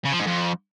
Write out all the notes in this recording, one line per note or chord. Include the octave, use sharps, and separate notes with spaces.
C#3
F3
G#2
F2